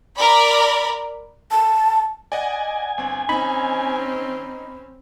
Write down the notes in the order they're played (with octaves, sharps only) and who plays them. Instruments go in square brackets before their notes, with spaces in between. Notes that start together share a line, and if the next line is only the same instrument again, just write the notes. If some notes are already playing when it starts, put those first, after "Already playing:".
[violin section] A#4 D5 B5
[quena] A5
[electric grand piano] D5 D#5 F#5 [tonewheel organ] G#5
[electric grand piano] G1 C4
[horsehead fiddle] C4 C#4 [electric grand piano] D#4 [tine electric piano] B5